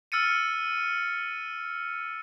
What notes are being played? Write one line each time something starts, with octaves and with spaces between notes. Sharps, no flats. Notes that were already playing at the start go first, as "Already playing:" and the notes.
E6 F6 A6 C#7 D#7